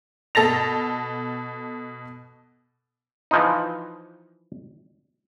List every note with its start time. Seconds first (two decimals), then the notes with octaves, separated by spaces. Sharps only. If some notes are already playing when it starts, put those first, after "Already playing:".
0.35 B2 A4 A6 A#6 F7
3.31 E3 F3 D#4